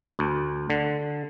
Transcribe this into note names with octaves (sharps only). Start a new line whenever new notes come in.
D2
D3